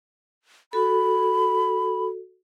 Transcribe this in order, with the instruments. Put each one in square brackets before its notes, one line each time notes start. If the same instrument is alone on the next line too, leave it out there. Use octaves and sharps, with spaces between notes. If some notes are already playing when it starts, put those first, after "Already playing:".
[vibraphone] F#4 A4 [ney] B5